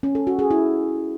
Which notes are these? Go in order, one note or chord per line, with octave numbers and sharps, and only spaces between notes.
C#4
A4
F#4
G#4
E4